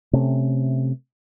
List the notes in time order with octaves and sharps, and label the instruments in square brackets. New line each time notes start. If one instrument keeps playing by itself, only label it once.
[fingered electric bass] C3 A3 C#4